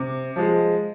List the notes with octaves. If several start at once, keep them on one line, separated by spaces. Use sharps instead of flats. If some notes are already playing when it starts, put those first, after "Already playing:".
Already playing: C3
F3 G#3